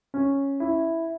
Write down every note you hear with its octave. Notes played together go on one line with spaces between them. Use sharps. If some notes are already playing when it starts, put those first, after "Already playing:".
C#4
E4